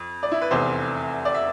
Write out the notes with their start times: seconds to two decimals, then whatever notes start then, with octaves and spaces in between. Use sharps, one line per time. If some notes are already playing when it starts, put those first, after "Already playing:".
Already playing: F2
0.23 D5
0.32 E4
0.42 B4
0.51 F1 E2 C3 C5
1.25 D5
1.35 E5